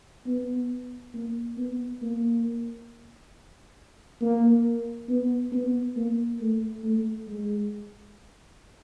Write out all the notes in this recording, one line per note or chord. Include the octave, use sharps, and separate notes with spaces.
B3
A#3
B3
A#3
A#3
B3
B3
A#3
A3
A3
G#3